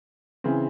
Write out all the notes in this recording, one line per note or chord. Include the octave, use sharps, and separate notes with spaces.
C#3 E3 C4